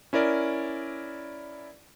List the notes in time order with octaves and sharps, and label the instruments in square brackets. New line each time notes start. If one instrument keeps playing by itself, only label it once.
[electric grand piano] C#4 E4 A#4 D5